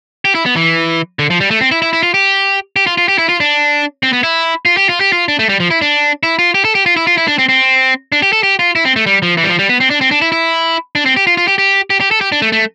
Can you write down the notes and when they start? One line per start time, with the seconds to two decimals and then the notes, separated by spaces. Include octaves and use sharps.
0.25 G4
0.35 E4
0.46 B3
0.56 E3
1.19 D3
1.30 F3
1.40 G3
1.51 A3
1.61 C4
1.72 E4
1.82 E4
1.93 E4
2.03 F4
2.14 G4
2.76 G4
2.87 F4
2.98 F4
3.08 G4
3.18 E4
3.29 F4
3.40 D4
4.03 C4
4.13 B3
4.23 E4
4.65 F4
4.77 G4
4.89 F4
5.01 G4
5.13 F4
5.28 D4
5.39 A3
5.49 G3
5.60 F3
5.71 E4
5.82 D4
6.23 E4
6.39 F4
6.55 G4
6.65 A4
6.75 G4
6.86 F4
6.97 E4
7.07 F4
7.18 E4
7.28 D4
7.38 C4
7.49 C4
8.12 D4
8.22 G4
8.33 A4
8.43 G4
8.59 F4
8.75 E4
8.85 C4
8.96 A3
9.06 G3
9.22 F3
9.37 E3
9.44 G3
9.48 F3
9.59 G3
9.69 B3
9.80 C4
9.90 D4
10.01 C4
10.11 D4
10.22 E4
10.32 E4
10.95 D4
11.06 C4
11.17 G4
11.27 F4
11.37 F4
11.48 G4
11.58 G4
11.90 G4
12.01 G4
12.11 A4
12.21 G4
12.32 D4
12.42 A3
12.52 A3